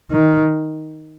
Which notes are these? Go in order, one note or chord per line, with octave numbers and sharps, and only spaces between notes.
D#3